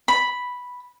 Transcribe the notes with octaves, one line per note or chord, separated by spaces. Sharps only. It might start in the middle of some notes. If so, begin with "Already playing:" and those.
B5